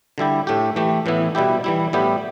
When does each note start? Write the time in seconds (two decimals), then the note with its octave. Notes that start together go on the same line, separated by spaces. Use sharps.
0.18 D3 G3 E4 G4
0.47 A2 A3 G4
0.76 E3 A3 G4
1.06 A2 E3 B3 E4
1.35 B2 G3 E4 G4
1.64 E3 G3 E4
1.93 A2 G3 B3 E4 G4